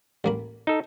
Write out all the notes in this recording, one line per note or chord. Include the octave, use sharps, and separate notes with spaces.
A1 A#3 B5
D#4 A4